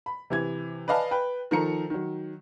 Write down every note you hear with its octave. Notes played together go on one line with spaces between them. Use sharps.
B5
C3 E3 G#6
B4 D5 D#5 F5 G#5 A5
B4 G5
D#3 F3 A4 A#4 A#5 C#7
D#3 F#3